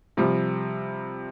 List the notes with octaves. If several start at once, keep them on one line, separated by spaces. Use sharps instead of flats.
C3 F3 G3